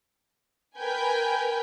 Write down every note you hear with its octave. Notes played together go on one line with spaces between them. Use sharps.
A#4 B4 G5 G#5